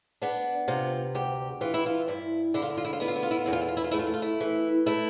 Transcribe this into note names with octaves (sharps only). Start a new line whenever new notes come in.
B3 D4
C3 F4
D2 G4
E3 F4
E4
F4
G2 E4
D3 E4
F4
E4
F4
E4
F4
B3 E4
F4
E4
F4
E4
F4
E2 E4
F4
E4
F4
E4
F4
A3 E4
F4
E4
F4
E4
E3
A3 E4